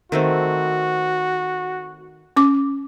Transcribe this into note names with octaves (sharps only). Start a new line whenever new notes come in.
D#3 A3 C4 F#4
C#4 D6